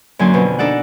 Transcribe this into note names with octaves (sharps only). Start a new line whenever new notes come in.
F#2 D3 F#3 A#3 G#5 C6
F2 B2 D3 F4
D4 D#4 A4 D5 F#5